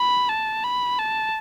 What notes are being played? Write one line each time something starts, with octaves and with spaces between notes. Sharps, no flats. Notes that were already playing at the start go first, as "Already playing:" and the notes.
Already playing: B5
A5
B5
A5